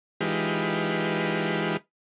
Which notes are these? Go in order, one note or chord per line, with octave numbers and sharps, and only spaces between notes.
E3 G#3 D#4 F4 G4 B4